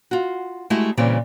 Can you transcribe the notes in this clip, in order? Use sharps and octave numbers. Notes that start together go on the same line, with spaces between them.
F4 F#4
G#3 A3 E4 F#4 G4
A#2 C#3 E3 G3 C4 G4